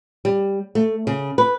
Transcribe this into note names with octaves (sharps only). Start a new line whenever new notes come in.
G3
A3
C#3
B4